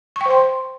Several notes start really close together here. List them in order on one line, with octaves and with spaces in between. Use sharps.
C#6 G5 C5 C6